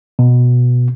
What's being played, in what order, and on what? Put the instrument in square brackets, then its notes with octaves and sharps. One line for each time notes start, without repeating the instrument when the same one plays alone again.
[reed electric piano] B2